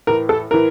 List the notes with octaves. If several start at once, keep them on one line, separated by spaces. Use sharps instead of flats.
A2 E3 A#4
A4
A2 E3 A#4